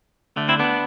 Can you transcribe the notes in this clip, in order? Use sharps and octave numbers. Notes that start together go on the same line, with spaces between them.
D2 D3 A3
C4 E4
B3 D4